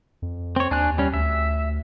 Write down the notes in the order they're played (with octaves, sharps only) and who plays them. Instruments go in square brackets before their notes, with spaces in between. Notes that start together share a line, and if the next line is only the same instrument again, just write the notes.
[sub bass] F2
[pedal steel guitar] C4 C#5
[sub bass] D#2 [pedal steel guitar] D4 G#5 F#6
[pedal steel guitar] G3 C#4
[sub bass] D2 [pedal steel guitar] E5